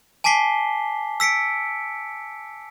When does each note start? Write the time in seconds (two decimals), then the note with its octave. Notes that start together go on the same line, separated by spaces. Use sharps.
0.24 G#5 A5 D6 B6 C7 G7
1.20 E6 B6 C#7 D7